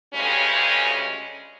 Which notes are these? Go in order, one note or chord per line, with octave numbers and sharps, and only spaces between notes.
D2 G2 C#3 G3 G#3 C#4